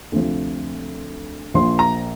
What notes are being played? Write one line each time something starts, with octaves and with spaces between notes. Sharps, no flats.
D2 C3 F3
A#1 A#2 F3 C6
A#5